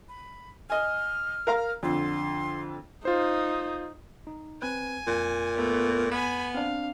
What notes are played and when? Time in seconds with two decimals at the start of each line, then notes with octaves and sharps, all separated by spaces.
0.09 B5
0.70 D#5 G#5 F6
1.47 A#4 F5 A#5
1.83 F2 D3 C6
3.05 D#4 F4 C5
4.27 D#4
4.62 C4 B4 G#5
5.07 F2 A#2
5.56 A3 B3
6.11 B3 G#5 B5
6.54 C4 D4 F5